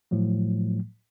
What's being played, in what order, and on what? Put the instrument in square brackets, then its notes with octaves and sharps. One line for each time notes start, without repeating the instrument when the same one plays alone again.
[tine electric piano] A2 F3 F#3 A3